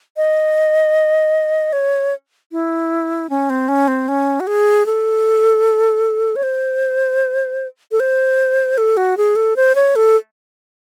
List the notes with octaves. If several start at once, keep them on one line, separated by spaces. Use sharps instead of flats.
D#5
C#5
E4
C#4
C4
C#4
C4
C#4
F#4
G#4
A4
C#5
C5
A4
C5
A4
F#4
G#4
A4
C5
C#5
A4